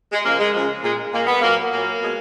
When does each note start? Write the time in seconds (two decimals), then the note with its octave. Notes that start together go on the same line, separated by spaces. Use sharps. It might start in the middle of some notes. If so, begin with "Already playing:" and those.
0.12 G#3
0.23 C#3 F3 G#3 A#3
0.38 G#3
0.53 C#3 F3 G#3
0.82 A#2 G#3
1.12 A#2 G#3 A#3
1.27 B3
1.41 A#2 F#3 A#3
1.71 A#2 F#3 A#3
2.01 B2 G#3